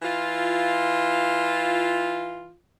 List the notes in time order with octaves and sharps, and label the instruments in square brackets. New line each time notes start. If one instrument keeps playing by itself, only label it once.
[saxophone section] E3 F4